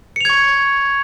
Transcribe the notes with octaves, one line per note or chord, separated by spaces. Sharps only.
C#6 G#6 C#7 F7